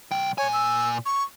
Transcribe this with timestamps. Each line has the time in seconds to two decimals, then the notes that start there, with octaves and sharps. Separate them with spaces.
0.12 B1 G5
0.38 A#2 C#5 G#5
0.53 E6
1.06 C#6